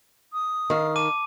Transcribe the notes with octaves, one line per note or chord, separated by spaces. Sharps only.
D#6
D#3 F5
A5 D6 D#7